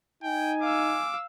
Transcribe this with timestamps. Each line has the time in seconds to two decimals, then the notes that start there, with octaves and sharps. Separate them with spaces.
0.23 D#4 G5 G#5
0.62 F5 D6 E6